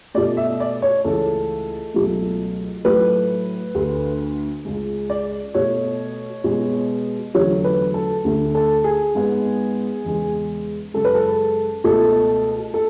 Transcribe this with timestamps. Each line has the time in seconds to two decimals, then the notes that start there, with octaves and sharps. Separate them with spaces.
0.14 B2 A3 D5
0.37 E5
0.60 D5
0.82 C#5
1.05 C#2 C#3 E3 A3 A4
1.94 C#2 B2 F#3 A3
2.85 A2 F#3 A3 B4
3.75 D2 D3 A3
4.65 C#2 C#3 G#3
5.10 D5
5.54 B2 A3 C#5
6.44 B2 G#3 B3
7.34 E2 D3 F#3 A3 C#5
7.64 B4
7.94 A4
8.24 D2 D3 A3
8.55 A4
8.84 G#4
9.15 G#2 G#3 B3
10.05 E2 C#3 G#3
10.94 F#2 C#3 G#3 A4
11.05 B4
11.15 A4
11.84 C#2 B2 A3 A4
12.74 A4